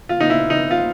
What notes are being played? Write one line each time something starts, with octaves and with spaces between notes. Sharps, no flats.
F4
D#4
E4
D#4
F4